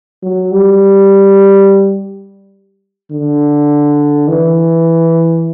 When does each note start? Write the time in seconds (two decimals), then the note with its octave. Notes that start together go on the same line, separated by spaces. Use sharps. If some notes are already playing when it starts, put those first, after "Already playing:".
0.23 F#3
0.52 G3
3.12 D3
4.28 E3